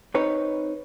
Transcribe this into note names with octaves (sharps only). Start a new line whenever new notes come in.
C4 D#4 B4 C#5